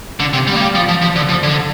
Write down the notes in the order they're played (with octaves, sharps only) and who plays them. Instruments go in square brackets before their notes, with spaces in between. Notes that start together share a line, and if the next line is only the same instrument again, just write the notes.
[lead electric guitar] D3
C3
G3
A#3
G3
F3
F3
F3
D3
F3
D3